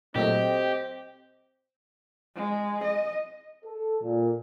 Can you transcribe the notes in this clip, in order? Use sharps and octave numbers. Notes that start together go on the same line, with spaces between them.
A#2 F#3 A3 C4 G4 D#5
G#3
D#5
A4
A#2